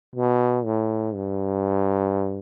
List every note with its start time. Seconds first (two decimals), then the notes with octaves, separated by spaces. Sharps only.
0.16 B2
0.65 A2
1.15 G2